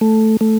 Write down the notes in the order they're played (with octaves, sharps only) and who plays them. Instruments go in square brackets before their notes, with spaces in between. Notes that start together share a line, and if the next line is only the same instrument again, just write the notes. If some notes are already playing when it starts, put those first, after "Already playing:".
[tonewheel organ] A3
A3